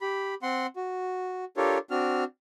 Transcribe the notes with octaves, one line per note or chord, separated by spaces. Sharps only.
G4 B5
C4 F#5 C6
F#4
D4 F4 G4 A4 A#4 C#5
C4 D4 F#4 F6